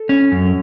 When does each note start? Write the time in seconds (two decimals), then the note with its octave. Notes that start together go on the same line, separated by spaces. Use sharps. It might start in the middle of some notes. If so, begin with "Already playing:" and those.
Already playing: A4
0.09 C#4
0.32 F#2